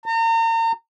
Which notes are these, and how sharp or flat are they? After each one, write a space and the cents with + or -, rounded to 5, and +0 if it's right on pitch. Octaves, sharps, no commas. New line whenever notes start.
A#5 -40